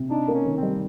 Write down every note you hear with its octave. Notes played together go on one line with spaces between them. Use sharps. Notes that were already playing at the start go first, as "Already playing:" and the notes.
Already playing: C3
D4 D#4
A#3
C#4
D#3
C4
G3